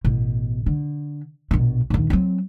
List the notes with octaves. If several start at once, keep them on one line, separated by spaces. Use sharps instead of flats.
A1 B2
D3
A#1 B2
A#1 D#2
F#3 C4